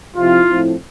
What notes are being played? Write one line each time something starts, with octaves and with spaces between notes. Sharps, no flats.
C3 F3 C4 E4 F4
A2 F3 C4 E4